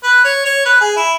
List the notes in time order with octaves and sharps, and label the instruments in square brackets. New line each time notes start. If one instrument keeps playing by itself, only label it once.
[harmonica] B4
C#5
C#5
B4
G#4
E4